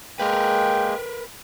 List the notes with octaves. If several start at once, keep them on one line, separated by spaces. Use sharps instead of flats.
G#3 A#3 A#4 B4 G5